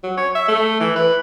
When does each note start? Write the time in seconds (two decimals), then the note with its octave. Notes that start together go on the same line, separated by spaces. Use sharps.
0.03 F#3
0.17 C#5
0.35 E5
0.48 A3
0.80 E3
0.96 B4